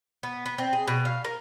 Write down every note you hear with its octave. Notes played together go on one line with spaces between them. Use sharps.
B3
B3
C4
G#4
B2
F5
A#4